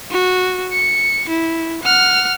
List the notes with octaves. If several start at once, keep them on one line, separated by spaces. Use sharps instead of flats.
F#4
C#7
E4
F#5 F6